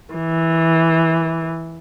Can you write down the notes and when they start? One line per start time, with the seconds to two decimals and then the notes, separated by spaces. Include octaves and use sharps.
0.14 E3